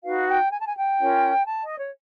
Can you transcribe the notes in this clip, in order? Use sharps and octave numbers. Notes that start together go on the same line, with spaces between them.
D#4 F#4 B4 F5
G5
G#5
A5
G#5
G5
C#4 F4 A#4 C#5
A5
D#5
C#5